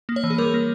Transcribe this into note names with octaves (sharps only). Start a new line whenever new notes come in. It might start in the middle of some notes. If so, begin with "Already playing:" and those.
A#3
C#5
E3
G#4
G3 A#4
A#3